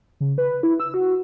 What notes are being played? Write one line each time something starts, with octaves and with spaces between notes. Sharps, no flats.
C#3
B4
E4
E6
F#4